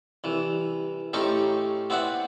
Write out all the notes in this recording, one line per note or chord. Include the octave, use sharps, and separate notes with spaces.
C2 E3
A2 C4 C#4 D#4 G4
B3 C4 E4 D5 F#5